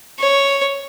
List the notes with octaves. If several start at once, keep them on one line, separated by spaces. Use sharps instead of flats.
C#5